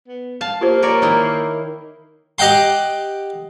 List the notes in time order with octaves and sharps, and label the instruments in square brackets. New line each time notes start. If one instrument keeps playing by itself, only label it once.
[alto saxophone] B3
[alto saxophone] F5 [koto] A5
[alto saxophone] A#3 [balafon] F4 G4 C5
[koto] A#4 C#5 D5
D#3 D#4 E4
[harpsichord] G4 D#5 F#5 G5 C6